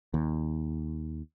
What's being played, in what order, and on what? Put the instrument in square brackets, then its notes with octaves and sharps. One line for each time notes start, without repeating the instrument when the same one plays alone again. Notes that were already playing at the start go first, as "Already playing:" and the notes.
[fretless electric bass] D#2